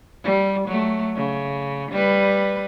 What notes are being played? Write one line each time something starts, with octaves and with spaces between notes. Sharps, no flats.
G3
F#3 A3
C#3
G3 B4